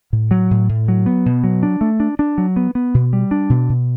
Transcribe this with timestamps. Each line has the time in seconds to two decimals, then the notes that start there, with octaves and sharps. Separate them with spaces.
0.13 A2
0.31 F#3
0.51 A2
0.69 A2
0.88 F#3
1.06 B3
1.26 B2
1.44 F#3
1.63 D4
1.81 A3
2.00 D4
2.19 D4
2.38 F#3
2.56 B3
2.75 B3
2.94 B2
3.13 G3
3.31 D4
3.50 B2
3.69 B2